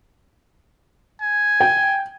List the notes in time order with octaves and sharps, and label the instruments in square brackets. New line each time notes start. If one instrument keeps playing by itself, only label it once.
[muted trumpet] G#5
[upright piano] G5